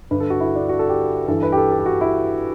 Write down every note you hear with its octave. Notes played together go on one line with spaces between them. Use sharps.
G2 D3 B4
A4
F#4
E4
D4
F#4
A4
G4
G2 E3 A4
B4
G4
A4
A4
G4
F#4
E4